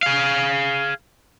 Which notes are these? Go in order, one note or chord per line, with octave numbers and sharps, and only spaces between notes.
G#4 F5